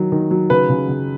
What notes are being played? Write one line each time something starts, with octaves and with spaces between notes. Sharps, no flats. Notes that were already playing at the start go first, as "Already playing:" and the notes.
Already playing: D#3 F#3
D#3
F#3
C#3 B4
C#3
C#3